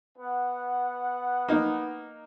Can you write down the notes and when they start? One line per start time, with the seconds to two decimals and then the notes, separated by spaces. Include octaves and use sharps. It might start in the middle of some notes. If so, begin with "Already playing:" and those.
0.18 B3 F#5
1.48 A#3 D#4